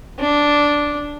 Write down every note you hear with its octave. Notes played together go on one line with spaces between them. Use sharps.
D4